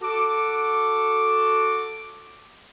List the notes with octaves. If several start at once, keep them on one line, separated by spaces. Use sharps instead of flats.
F#4 A4 D6